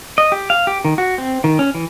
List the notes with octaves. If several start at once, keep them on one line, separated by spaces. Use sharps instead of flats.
D#5
G4
F5
G4
D#3
F#4
C4
D#3
C#4
E3